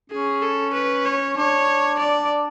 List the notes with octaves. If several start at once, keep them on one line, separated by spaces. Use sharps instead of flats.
C#4 G#4
A4
B4
C#5
D4 C#5
D5